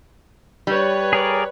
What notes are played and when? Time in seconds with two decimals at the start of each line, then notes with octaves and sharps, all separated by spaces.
0.67 G3 B4 C#5
1.13 G#4 A#4 D5